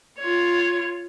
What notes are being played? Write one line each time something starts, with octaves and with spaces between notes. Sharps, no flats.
F4 C#5